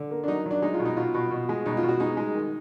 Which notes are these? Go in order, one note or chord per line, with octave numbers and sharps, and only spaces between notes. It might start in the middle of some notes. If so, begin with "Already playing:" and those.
Already playing: D3
A#3
D4
F#3 D#4
F#3 D4
G#3 D#4
F4
B2
D#4
B2 F4
B2
B2
G#3
B2 D#4
F4
B2
F#4
G#3 D#4
G#3
D#3